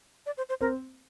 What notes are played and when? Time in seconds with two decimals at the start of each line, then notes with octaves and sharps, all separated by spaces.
0.26 D5
0.37 C5
0.49 C5
0.61 C4 A#4